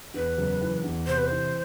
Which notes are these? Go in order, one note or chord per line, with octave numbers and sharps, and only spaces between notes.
E2 B4
F#1
E3
E2
C3 C5
B4
E3 C5